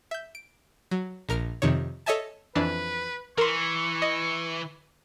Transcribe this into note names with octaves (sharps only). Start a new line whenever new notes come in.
E5 G6
D7
F#3
A#1 A#4 F6
F2 C3 D#3 C#5
A4 C#5 D#5 E5 G#5 A5
F2 E3 D4 B4
E3 A#4 C6 C#6
D#5